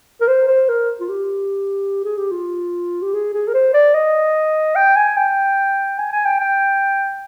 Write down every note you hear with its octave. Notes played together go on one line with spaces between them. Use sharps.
A#4
C5
C5
A#4
F4
G4
G#4
G4
F4
G4
G#4
G#4
A#4
C5
D5
D#5
G5
G#5
G5
G#5
G#5
G5
G5